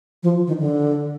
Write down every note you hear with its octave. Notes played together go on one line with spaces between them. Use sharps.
F3
D#3
D3